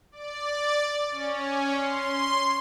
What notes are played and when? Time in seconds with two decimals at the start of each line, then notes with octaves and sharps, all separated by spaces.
0.12 D5
1.11 C#4
1.78 C6